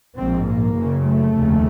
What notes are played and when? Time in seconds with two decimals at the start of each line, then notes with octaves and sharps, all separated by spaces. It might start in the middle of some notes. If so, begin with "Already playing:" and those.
0.16 A#1 G#2 C4
0.46 A#3
0.76 F#1 F#2 C#3
1.06 A3
1.36 F1 D#2 C#3